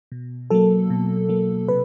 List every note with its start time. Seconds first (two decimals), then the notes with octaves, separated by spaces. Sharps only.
0.12 B2
0.50 F#3 A#3 A4
0.90 B2
1.29 F#3 A#3
1.68 C3 B4